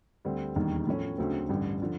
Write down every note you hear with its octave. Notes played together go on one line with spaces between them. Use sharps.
D2 D3 G3 C4
E1 D#2 D#3 G3
A2 F3 A3 C#4
D2 C#3 F#3 A3 C4
A1 G2 D3 G3
D3 F3